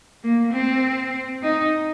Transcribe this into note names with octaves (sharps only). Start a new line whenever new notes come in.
A#3
C4
D#4